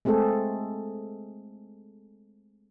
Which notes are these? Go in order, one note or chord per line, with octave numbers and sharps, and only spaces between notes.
G#3 A3 C4 G#4 A4